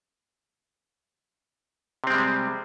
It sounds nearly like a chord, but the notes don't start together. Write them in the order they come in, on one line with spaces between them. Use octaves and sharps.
C3 C4 G#3 G3